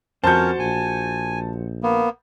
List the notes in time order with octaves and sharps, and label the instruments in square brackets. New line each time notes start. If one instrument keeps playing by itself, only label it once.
[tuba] F2 [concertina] C#4 A#4 C#5 [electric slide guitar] F#4 C5 [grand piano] A5 G6
[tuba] A#1 [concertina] G#5
[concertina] A#3 B3